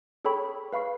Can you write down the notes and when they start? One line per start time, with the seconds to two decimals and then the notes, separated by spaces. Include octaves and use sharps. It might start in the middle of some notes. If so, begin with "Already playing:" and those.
0.25 G#4 A4 C#5 G5 B5 C#6
0.73 B4 F5 B5 C#6 C7